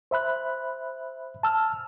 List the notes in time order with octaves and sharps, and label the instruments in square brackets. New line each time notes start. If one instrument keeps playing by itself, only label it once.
[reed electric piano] C5 E5 B5 F#6
A5 E6 F6